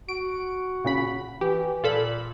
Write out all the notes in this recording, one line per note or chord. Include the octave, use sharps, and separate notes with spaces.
F#4 D7
A#2 C#3 B5
E3 G4
A#2 F4 A4 B5